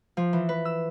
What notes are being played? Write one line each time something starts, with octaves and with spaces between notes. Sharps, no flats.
F3
E3
B4
E6